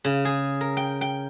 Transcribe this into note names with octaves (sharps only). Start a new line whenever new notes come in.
C#3
G#4
A#4
G5
G5